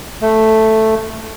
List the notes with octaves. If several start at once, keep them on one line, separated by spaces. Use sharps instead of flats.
A3